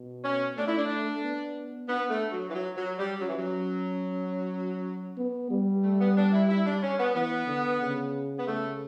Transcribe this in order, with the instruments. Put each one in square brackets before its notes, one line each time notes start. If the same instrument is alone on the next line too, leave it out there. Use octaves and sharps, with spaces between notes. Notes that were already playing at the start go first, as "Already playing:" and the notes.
Already playing: [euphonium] B2
[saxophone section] C#4
[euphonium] A3 [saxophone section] D4
[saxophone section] E4
D4
[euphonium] B3
[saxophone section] B3 [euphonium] D4
[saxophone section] A3
F#3
E3
F#3
F#3
G3
[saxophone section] F#3 [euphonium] C#4
[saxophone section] E3
F#3
[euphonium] B3
G3
[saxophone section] A3
B3
D4
E4
E4
D4
C#4
B3
[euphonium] E3 [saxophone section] B3
[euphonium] D3
C#3
[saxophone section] B3
[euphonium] C#3 [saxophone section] A3